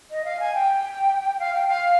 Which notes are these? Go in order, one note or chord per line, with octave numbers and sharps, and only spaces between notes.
D#5
F5
G#5
G5
F5
G5
F5